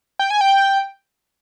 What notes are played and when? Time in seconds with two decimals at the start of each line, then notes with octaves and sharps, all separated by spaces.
0.19 G5
0.30 G#5
0.41 G5